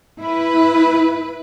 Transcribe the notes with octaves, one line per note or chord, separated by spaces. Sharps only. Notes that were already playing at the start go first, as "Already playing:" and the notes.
E4 B4